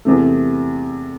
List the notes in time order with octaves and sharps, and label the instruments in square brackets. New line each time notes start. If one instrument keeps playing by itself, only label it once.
[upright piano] E2 C3 A3